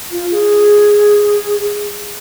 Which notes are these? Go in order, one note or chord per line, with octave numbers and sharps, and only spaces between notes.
F4
G#4